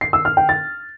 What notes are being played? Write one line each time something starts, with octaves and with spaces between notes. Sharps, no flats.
C7
E6
F6
G5
A6